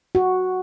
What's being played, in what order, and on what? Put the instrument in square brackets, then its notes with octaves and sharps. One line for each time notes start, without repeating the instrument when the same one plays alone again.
[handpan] F#4